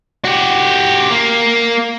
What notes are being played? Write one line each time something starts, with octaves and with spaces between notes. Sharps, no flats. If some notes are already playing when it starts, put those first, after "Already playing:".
F#4 G4
A#3